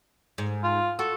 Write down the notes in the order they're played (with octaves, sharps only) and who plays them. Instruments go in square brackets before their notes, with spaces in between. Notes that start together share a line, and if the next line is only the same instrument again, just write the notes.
[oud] G#2
[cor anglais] F4
[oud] F#4 [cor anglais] A4